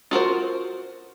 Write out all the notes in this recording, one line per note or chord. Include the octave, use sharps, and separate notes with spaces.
F4 F#4 A#4 C5